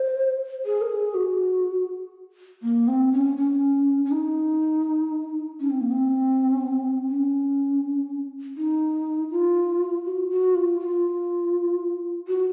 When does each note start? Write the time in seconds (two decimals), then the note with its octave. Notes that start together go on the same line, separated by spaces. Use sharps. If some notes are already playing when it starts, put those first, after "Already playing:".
Already playing: C5
0.66 G#4
0.81 A#4
0.90 G#4
1.14 F#4
2.63 A#3
2.88 C4
3.12 C#4
3.37 C#4
4.05 C#4
4.11 D#4
5.60 C#4
5.70 C4
5.81 A#3
5.91 C4
7.08 C#4
8.57 D#4
9.31 F4
10.06 F#4
10.30 F#4
10.55 F4
10.80 F4
12.28 F#4